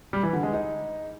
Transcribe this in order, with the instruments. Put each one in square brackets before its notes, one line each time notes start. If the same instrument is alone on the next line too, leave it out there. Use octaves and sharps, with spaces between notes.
[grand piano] G3
E3
D3
G#3
D#4